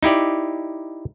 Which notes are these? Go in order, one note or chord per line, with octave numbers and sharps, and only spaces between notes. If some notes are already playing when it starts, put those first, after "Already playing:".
D#4 E4 G4 D5